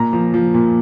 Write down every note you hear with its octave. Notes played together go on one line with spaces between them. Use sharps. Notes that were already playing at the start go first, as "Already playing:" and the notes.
Already playing: A#2 A#5
F3
F3
A#2